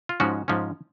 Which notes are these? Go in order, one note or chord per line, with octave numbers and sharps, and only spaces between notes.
F4
G#2 F3 G#3 C#4 F#4
G#2 F3 G#3 C#4